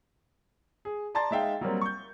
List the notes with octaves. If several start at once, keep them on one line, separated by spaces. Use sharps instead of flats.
G#4
D5 A5 A#5 C6 A6
G#3 D#4 E5 F5 G5
F#3 G3 A#3 C4
C#6 G6